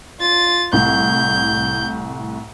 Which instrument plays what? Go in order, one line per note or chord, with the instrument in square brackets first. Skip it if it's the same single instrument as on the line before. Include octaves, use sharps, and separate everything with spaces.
[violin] F4 A6
[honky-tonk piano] C2 A2 [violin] G6